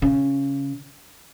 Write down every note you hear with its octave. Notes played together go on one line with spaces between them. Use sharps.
C#3